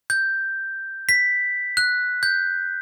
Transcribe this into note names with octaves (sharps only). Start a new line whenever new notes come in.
G6
B6
F#6
G6